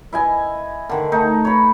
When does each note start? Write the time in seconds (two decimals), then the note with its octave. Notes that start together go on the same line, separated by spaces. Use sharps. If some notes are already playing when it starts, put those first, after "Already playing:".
0.13 E4 D#5 G#5
0.89 D3 D#3
1.12 A3 D#4
1.45 C#5 B5